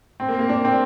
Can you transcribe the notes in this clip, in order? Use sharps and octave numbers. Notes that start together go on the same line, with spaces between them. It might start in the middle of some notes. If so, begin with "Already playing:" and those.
C4
A#3
A#3
D4
C4